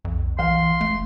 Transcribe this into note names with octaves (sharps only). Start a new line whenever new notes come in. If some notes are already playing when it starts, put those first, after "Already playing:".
B1 F2
B1 E3 F5 C6
F1 A3